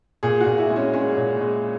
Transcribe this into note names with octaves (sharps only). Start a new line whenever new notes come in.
A#2 G#4
F#4
A#2
E4
G#3
C#4
G#3 C#4
A#2
G#3